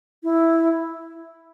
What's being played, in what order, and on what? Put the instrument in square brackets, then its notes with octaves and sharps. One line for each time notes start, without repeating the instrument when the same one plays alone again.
[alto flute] E4